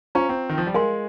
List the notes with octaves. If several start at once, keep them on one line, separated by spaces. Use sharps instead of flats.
C#4 F4 C5 F5 A#5 C#6
C4
D#3
F3
G3
G#3 A#4 F5 G#5 C6